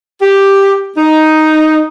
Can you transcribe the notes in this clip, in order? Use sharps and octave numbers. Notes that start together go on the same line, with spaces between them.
G4
D#4